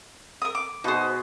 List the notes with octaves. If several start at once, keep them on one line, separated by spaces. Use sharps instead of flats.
A#4 D#6
D6
B2 D#4 F#4 G#4 C5